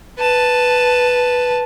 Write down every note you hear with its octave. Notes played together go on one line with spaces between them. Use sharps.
B4 A5